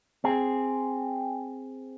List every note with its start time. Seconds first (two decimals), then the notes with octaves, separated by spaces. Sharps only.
0.24 C4 G#4